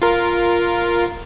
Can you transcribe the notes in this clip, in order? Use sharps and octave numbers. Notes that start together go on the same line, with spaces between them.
F4 A#4